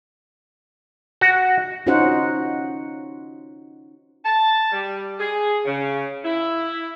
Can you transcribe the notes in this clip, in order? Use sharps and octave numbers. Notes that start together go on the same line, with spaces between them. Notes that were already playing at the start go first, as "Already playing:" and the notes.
F#4
C#4 D#4 F4 F#4 C5 F#5
A5
G3
G#4
C#3
E4